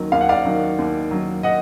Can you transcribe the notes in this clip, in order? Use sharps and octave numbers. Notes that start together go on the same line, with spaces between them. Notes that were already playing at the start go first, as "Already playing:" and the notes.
Already playing: D#2 D#3 F#3
D#2 F5
F#5
D5 F5
D#3 F#3
D#2
D#3 F#3
D#5 F#5